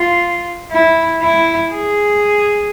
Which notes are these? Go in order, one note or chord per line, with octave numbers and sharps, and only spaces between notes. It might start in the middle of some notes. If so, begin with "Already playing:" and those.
Already playing: F4
E4
E4
G#4